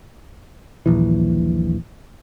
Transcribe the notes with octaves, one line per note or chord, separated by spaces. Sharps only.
D#1 A#1 E3